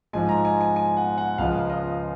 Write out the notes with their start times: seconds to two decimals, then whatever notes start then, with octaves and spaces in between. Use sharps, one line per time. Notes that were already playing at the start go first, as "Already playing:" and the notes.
0.13 G#2 F3 G#3 G#5
0.29 A#5
0.45 G#5
0.61 G#5
0.76 G#5
0.97 F#5
1.18 F#5
1.38 C#2 C#3 F3 G#3 F5
1.70 D#5